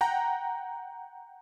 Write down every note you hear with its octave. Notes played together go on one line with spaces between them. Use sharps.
F#5 G5 A#5